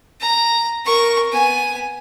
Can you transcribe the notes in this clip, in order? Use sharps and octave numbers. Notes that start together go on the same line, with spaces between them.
A#5
A#4 C#6
B3 G#5